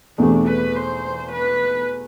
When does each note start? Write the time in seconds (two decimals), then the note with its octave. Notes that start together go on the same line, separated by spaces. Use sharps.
0.18 E2 B2 A3 C4 D4 G4
0.47 B4
0.76 C5
1.32 B4